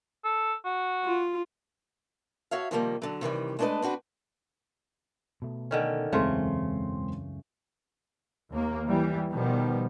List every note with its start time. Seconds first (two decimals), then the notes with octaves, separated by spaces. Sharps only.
0.24 A4
0.65 F#4
1.05 F4
2.51 F#4 C#5 E5 F5
2.71 C3 D#3 F3 G3 G#3 A#3
3.02 D3 F#3
3.21 C3 D#3 E3 G3
3.59 G#3 A3 D4 G#4 B4 D#5
3.82 C4 D4 F#4 B4
5.42 B2 A3
5.71 D3 D#3 C#4
6.12 E1 C#2 F#2 C#3 E3 A3 C4 C6
8.51 D#2 A#3
8.87 E3 G3
9.30 B2 D#3 F3 G3 B3